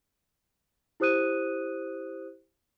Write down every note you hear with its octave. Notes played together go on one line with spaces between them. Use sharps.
E4 G4 C5 D#6 F#6 D#7